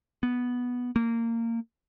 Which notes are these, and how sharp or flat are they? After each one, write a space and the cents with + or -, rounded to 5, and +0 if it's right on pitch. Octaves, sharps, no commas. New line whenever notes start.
B3 -5
A#3 -20